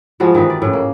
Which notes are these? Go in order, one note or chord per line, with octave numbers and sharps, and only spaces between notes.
F3 G3 G#3 F#4
D#3 E3 G3 D#4
D5
A2 C#3
A#3